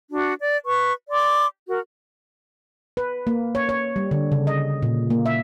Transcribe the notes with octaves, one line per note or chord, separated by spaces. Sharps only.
D4 F#4
D5
B4 C#6
D5 C6 D6
F#4 A#4
B4
A#3
C#5
C#5
G3
D3
C#3
D#5
A#2
A#3
E5